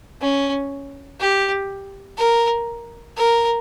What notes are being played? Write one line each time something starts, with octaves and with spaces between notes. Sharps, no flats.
C#4
G4
A#4
A#4